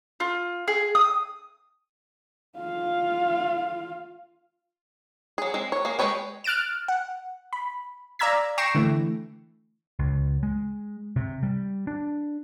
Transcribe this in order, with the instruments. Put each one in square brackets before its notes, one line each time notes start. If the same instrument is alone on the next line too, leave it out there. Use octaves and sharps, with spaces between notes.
[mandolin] F4
G#4
D#6
[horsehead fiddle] F4 F5
[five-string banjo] F#3 G#4
G#3 C4
C#5
A#3 G#4
G#3 A#4 B4 C#5 G5
[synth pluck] F6 F#6 A6 D7 E7
F#5
B5
D5 F5 A#5 E6 G#6 B6
G5 C#6 A#6 C7 D7 E7
D3 E3 A3
[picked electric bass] C#2
G#3
C3
G3
D4